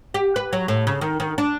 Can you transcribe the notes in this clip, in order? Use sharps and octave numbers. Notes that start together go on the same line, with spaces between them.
G4
B4
F#3
A2
C#3
D#3
D#3
D4